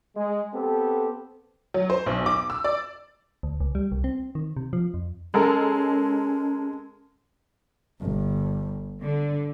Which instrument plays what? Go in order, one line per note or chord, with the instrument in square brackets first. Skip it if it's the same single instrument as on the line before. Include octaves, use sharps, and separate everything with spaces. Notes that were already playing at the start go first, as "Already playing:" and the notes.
[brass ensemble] G#3
B3 C4 G4 A4
[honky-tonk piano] F#3
C5
B1
D6
E6
D5
[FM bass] D2
C#2
G3
C2
C4
D#3
C3
F3
F2
[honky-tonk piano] G#3 A4 A#4 [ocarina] C#4
[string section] G1
D3